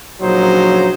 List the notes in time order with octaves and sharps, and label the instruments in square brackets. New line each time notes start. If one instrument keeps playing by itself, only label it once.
[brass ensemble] A#1 C#3 F#3 D#4 C5